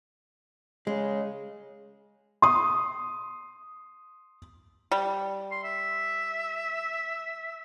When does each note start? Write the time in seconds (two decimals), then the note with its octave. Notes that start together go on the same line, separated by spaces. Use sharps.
0.87 C#3 G#3
2.42 C6 D#6
4.92 G3
5.51 C6
5.64 E5